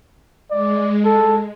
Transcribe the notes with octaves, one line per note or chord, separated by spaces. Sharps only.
G#3 D5
A4